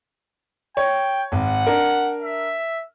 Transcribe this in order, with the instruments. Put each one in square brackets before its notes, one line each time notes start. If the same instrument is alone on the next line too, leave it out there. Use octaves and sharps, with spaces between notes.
[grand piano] C#5 [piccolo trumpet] G5
[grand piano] G#1 [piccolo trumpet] F#5
[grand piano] D4 A#4
[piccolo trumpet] E5